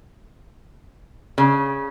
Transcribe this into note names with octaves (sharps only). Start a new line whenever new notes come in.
C#3